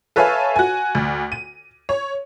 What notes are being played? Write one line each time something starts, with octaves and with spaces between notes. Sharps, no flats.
A4 B4 C#5 E5 F5 G#5
F#4 G#5
D2
D#7
C#5